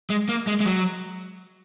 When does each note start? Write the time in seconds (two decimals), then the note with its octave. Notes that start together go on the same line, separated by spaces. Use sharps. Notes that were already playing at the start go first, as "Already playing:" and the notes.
0.10 G#3
0.29 A#3
0.47 G#3
0.60 G#3
0.65 F#3